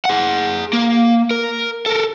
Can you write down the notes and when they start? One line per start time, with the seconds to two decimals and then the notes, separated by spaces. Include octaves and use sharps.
0.05 G#4 F#5
0.73 A#3
1.31 A#4
1.86 A4 A#4